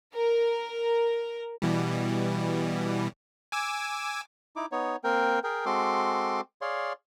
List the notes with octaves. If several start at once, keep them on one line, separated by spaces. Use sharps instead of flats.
A#4
B2 E3 G3
G#5 D6 E6
D#4 E4 D6
B3 D#4 C#5
A#3 C4 A#4 G5
G#4 A#4 G5
G#3 C4 F#4 A4 C6 D6
G#4 C#5 D5 F5 C6